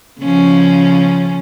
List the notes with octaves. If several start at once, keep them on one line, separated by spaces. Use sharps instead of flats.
C#3 F3 C#4